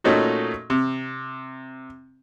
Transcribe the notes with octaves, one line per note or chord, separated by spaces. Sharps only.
A#2 A3 C#4 D#4 F#4
C3